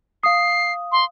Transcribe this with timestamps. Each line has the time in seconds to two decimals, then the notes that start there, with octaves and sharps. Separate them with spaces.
0.23 F5 D#6 C7
0.92 C6